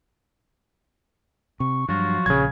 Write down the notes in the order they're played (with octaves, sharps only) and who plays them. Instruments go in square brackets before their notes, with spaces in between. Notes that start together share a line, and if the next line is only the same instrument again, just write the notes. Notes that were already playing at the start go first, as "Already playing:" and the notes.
[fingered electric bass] C3 [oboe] C#6
[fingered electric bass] G2 [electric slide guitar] F3 F#3 F4 [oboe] F#4
[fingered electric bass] A#1 [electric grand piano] C#3 G#6